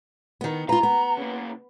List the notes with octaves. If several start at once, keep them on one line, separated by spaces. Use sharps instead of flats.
D#3 B3
F4 B4 A#5
B3
C#3 A#3